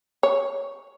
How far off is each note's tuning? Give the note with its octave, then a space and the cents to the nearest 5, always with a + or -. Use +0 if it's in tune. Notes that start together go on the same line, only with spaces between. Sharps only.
C#5 +0